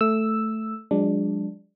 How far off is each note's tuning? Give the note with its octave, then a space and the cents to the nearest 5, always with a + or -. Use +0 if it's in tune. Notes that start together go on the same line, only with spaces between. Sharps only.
A3 +0 E6 +0
F3 +45 G#3 -25 D4 +0